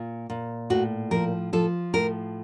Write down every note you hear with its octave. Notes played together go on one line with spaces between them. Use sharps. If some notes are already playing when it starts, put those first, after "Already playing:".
Already playing: A#2
A#2
A2 F#4
F3 A#4
F3 A4
A2 A#4